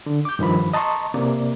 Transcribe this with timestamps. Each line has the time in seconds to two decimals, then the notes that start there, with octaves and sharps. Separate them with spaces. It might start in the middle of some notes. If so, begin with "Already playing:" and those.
0.06 D3
0.25 D6 G6
0.39 G2 D#3 F3 B5
0.73 D#5 A5 A#5 C6 C#6
1.14 C3 A#3 D5